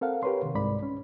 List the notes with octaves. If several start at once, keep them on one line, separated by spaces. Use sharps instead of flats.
C4 A4 A#4 F5 F#5
G4 A#4 B4 C#5 C6
C3 D#3
C2 G#2 D5 B5
C#4